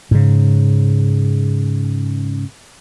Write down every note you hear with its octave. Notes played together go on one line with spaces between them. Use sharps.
G#2 C#3